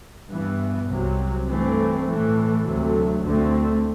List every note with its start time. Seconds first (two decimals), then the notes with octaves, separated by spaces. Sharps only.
0.29 G2 E3 B3
0.87 C2 C3 F#3
1.46 G2 E3 A3 C4
2.05 A2 E3 A3
2.64 D2 C3 F#3 A3
3.22 D2 D3 A3 C4